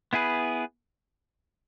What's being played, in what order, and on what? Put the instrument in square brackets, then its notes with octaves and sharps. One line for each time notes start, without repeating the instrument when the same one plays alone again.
[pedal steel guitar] B3 E4 G#4 B4